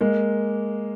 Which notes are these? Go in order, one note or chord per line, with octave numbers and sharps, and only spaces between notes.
G#3 A#3